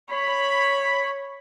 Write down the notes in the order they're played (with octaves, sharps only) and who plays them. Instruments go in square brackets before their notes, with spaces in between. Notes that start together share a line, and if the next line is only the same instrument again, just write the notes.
[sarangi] C#5 [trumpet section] B5